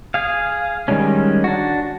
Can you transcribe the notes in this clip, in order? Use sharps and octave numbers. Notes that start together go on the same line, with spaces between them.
G#4 F5
D#3 G3 G#3 C#4
D4 F#4